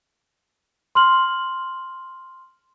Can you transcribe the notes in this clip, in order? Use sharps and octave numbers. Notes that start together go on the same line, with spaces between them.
C6 F6 F#7